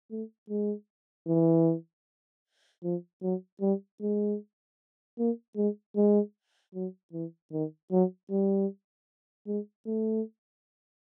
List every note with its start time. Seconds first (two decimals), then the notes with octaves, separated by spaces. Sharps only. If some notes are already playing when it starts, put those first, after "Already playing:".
0.11 A3
0.50 G#3
1.27 E3
2.84 F3
3.22 F#3
3.61 G3
4.01 G#3
5.19 A#3
5.57 G#3
5.96 G#3
6.74 F#3
7.13 E3
7.52 D#3
7.92 F#3
8.31 G3
9.47 G#3
9.86 A3